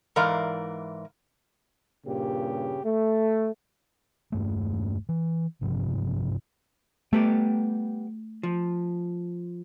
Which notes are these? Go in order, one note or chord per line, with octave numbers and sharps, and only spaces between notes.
G#2 E3 A#4 D5 F5
G2 A#2 C#3 G4
A3
E1 G2 A3
E3
G#1 G2 C3 F3
G3 A3 B3 G4
F3